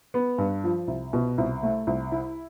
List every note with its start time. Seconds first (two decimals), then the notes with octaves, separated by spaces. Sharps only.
0.14 B3
0.38 G2
0.64 F3
0.88 C2
1.13 B2
1.38 C2
1.63 A3
1.87 C2
2.12 E4